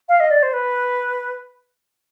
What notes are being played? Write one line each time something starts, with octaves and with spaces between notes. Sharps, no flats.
F5
D#5
D5
C5
B4